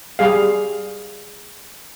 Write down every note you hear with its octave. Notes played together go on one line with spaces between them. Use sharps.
G3 G#4 F5